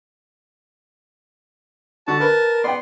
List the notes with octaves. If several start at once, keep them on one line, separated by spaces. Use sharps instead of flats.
D3 F#4 A5
A#4 B4
B3 D5 G5 C6